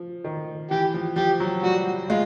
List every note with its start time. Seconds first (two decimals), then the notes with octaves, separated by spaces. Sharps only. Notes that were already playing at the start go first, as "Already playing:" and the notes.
Already playing: F3
0.24 D#3
0.71 E3 G4
0.94 F3
1.16 F3 G4
1.40 F#3
1.63 G3 F#4
2.10 G#3 F4